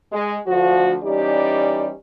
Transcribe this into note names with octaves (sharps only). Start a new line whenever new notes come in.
G#3
D2 F3 F#4
E3 G3 C#4 D#4 G4 D5